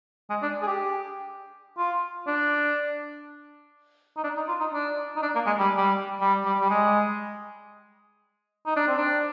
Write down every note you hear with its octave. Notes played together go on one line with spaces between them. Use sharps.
G#3
D4
G#4
G4
F4
D4
D#4
D4
D#4
F4
D#4
D4
D#4
D4
A#3
G#3
G3
G3
G3
G3
G3
G#3
D#4
D4
C4
D4